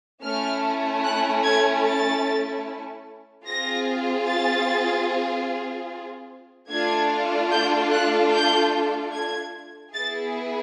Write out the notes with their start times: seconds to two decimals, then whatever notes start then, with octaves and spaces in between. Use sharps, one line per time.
0.22 A3 C#4 E4 A4 F6
1.04 F#6
1.44 G#6
1.85 A6
3.46 C4 F4 G#4 A#6
4.27 A6
6.70 A3 D4 F4 A4 G#6
7.51 G6
7.91 F#6
8.32 G6
9.12 G#6
9.93 B3 E4 G#4 A6